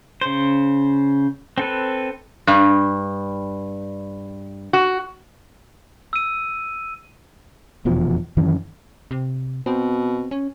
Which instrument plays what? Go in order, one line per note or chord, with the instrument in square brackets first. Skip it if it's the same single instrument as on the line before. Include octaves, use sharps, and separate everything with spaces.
[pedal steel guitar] C#3 C5
C4 A4 B4
[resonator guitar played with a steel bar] G2
F#4
[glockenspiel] E6 D#7
[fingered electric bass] F1 E2 B2 F3
F#2 D#3 E3 C#4
[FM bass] C3
[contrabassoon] B2 [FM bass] C4
[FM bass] C#4